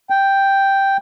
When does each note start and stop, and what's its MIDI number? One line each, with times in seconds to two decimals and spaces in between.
0.10 0.97 79